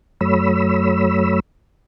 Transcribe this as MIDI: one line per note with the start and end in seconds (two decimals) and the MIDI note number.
0.21 1.40 42
0.21 1.40 54
0.21 1.40 57
0.21 1.40 73
0.21 1.40 83
0.21 1.40 88